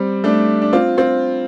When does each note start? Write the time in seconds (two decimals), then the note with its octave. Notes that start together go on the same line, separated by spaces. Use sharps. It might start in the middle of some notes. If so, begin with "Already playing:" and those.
Already playing: G3 C4
0.24 A3 D4
0.62 D4
0.73 C4 F4
0.98 C4 F4